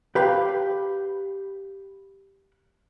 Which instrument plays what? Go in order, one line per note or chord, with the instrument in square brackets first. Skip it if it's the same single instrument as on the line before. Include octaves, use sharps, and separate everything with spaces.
[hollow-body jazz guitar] G4 B4 F5 G5